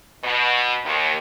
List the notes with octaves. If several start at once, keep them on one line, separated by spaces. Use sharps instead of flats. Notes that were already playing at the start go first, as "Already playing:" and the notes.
B2
D#2